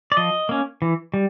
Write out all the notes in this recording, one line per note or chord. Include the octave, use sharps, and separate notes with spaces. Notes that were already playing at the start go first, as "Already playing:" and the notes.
D5
F3 D#5
A#3 C#4
E3
G3